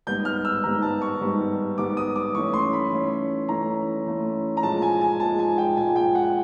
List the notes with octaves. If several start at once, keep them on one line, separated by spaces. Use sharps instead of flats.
G#2 D#3 G3 B3 G6
F6
E6
G#2 D#3 G3 B3 A#5
A5
C#6
G#2 D#3 G3 B3
G#2 D#3 G3 B3 D6
D#6
D6
E3 A3 C#4 C#6
C6
B5
E3 A3 C#4
E3 A3 C#4 A#5
E3 A3 C#4
A#5
A#2 F3 G#3 A5
G#5
G#5
A#2 F3 G#3 A5
G#5
G5
A#2 F3 G#3 G#5
G5
F#5